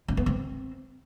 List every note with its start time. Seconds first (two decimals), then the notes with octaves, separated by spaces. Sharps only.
0.08 C#4
0.17 B3
0.26 C4